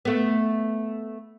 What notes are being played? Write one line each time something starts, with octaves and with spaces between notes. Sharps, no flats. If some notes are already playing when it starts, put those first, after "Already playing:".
A3 B3